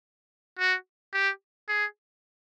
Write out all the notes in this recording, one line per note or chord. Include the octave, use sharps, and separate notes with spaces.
F#4
G4
G#4